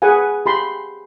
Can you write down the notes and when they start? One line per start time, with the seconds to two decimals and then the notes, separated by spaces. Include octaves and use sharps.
0.02 G#4 B4 F#5 G#5
0.46 G4 B5 C6